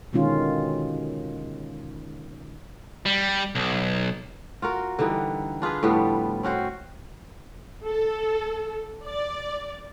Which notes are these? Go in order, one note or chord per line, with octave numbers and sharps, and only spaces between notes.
B2 D3 D#3 G#3 C#4 F4
G3
B1
F4 F#4 A#4
D3 E3 G3 D#4
D4 F4 G#4 B4
A2 F3 G3 B3
C4 C#4 F#4 C5
A4
D5